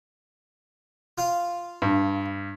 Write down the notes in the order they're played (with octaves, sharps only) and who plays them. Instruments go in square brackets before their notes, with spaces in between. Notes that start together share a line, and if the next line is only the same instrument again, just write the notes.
[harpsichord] F4 F5
[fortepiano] G2